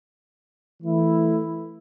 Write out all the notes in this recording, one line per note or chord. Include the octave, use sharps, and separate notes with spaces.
E3 A3 E4